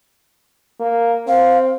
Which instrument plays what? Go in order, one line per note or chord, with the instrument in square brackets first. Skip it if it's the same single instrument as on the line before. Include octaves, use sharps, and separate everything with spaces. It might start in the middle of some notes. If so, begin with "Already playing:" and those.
[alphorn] A#3
[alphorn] C4 [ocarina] F5